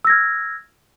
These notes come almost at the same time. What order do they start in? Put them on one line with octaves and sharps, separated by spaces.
E6 A#6 G#6 F6